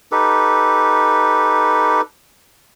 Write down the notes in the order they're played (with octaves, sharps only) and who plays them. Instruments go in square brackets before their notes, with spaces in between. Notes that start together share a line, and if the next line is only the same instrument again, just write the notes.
[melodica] D#4 G4 A4 B4